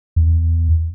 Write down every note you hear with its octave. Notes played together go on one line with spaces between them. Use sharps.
E2